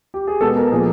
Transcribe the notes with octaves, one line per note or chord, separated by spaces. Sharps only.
G4
G#4
B2 G#3 B3 A4
A#4
A#2 F3 A#3 G#4